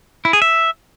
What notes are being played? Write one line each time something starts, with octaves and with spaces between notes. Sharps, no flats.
E4
G#4
E5